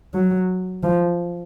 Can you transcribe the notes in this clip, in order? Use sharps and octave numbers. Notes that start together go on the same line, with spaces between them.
F#3
F3